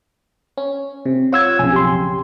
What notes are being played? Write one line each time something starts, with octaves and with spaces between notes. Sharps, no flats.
C#4
C3
F4 C#5 F#5 E6 G#6
B1 F2 C#3 G#5
G4 C6